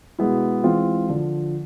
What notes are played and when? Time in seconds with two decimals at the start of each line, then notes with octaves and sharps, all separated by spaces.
0.19 B2 G#3 B3 E4
0.64 E3 G#3 C4 F4
1.09 D3 F3